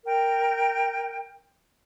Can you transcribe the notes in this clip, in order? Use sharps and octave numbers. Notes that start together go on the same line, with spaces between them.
A#4 G5